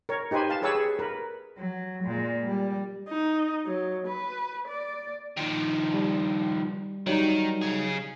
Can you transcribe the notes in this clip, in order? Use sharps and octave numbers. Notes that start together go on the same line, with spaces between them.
A#4 C#5
D#4 G4 B4 C5 G#5
F5 A5
G4 G#4 B4 C#5 A5 E6
G#4
A#4 B4
F#3
A#2 G#3
G3
D#4
F#3
B4
D5
D#3 F3
G3
D#3 F#3 G3 D#4
C#3 G#4